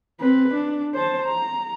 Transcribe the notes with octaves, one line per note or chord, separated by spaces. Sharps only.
C4 B4
D4
C5 A5
A#5